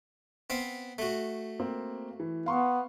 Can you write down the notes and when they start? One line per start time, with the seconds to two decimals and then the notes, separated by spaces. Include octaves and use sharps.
0.50 B3 C4 F5
0.98 A3 F#4
1.60 A#3 C4
2.20 E3
2.46 B3 F5 C6 C#6